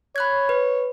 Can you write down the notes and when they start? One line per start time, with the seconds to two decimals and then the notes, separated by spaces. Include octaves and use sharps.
0.16 C#5 B5 F#6 G#6
0.49 B4